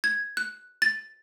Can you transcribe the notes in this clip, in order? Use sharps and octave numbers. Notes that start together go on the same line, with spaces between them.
G#6
F#6
A6